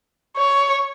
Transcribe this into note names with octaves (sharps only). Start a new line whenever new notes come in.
C#5